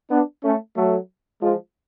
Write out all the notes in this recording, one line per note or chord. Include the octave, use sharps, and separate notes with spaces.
B3 D4
A3 C#4
F#3 A3
F3 G#3